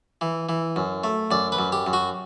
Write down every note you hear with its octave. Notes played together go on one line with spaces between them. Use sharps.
E3
E3
F#2
A3
F#2 D5
B4
F#2
G4
F#2
F#4